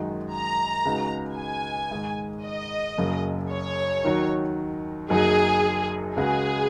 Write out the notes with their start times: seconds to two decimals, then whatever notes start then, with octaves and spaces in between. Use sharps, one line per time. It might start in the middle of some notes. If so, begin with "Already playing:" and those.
Already playing: F#2 D#3 G#3 D#4 F#4
0.32 A#5
0.85 C#2 C#3 G#3 D#4 F#4
1.37 G#5
1.91 G#2 D#3 G#3
2.44 D#5
2.98 F#1 F#2 C#3 F#3
3.51 C#5
4.04 D#2 D#3 F#3 D#4 F#4
5.10 F#1 F#2 F#3 D#4 F#4 G#4
6.16 C#2 C#3 G#3 F#4 G#4